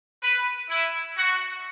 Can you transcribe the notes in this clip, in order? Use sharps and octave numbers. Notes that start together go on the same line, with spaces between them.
B4
E4
F#4